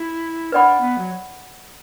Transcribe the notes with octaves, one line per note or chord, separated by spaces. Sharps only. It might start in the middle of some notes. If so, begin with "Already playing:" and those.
Already playing: E4
D4 B4 D5 F#5 B5
B3
F#3